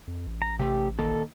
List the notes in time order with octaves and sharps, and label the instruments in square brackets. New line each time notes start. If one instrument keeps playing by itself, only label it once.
[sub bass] F2
A1
[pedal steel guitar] A#5
[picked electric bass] C3 A3 [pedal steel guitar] G4
[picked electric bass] D#1 D#3 A#3 [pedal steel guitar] A4